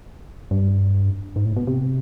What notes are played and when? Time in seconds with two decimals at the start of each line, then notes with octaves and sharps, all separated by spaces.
0.51 G2
1.36 G#2
1.46 A2
1.56 B2
1.67 C3